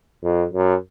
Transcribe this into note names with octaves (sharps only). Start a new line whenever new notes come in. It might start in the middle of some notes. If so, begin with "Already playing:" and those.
F2
F#2